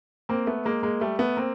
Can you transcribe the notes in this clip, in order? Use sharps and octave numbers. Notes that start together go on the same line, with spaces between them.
A#3 C4
A3 B3
G#3 A#3
G#3 A#3
G3 A3
A3 B3
A#3 C4